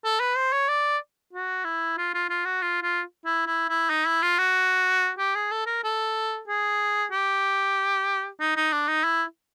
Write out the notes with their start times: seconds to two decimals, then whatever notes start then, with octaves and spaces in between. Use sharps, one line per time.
0.04 A4
0.20 B4
0.36 C5
0.52 C#5
0.68 D5
1.33 F#4
1.64 E4
1.97 F4
2.14 F4
2.30 F4
2.45 F#4
2.62 F4
2.82 F4
3.26 E4
3.47 E4
3.69 E4
3.90 D#4
4.06 E4
4.22 F4
4.38 F#4
5.18 G4
5.35 G#4
5.51 A4
5.66 A#4
5.84 A4
6.48 G#4
7.12 G4
8.40 D#4
8.56 D#4
8.72 D4
8.88 D#4
9.04 E4